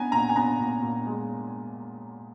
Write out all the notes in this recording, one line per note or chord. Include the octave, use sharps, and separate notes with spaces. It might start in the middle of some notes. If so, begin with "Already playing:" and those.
Already playing: B3 G#5 A#5
A#2 A#5
G#5
B3 A#5
A#2
A#2
G#3